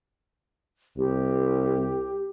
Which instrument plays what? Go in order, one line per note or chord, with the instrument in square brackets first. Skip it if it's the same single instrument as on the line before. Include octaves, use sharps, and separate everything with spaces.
[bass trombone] C2 [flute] G4